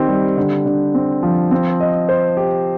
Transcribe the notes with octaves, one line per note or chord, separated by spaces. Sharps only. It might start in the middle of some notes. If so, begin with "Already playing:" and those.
Already playing: D#3 C4 G4
G3
D3
D3
C4
F3
C4
D#5
C5
G4